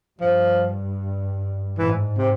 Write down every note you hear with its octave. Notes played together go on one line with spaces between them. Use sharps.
G2 F3
G#2 E3
C3